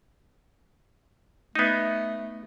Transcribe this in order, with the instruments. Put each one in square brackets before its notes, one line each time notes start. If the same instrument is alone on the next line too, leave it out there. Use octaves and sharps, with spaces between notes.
[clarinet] A3 [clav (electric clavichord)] B3 D#4